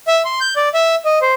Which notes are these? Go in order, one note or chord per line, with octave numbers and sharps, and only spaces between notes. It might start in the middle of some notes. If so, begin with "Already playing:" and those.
E5
C6
G6
D5
E5
D#5
C5